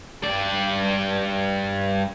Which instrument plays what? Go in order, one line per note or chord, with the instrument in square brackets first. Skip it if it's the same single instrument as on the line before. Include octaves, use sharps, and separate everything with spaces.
[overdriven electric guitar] G2 D5